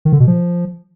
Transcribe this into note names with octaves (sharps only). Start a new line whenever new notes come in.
D#3
D3
B2
F3